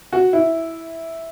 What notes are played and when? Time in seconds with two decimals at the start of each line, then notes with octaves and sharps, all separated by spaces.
0.13 F#4
0.33 E4